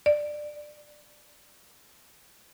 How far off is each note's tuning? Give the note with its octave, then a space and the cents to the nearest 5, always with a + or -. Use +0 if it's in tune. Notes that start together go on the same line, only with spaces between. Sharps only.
D5 +15